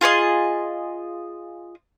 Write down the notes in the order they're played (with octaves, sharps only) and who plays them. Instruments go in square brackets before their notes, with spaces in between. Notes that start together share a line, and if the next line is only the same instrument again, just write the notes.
[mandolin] F4 G#4 C#5 D#5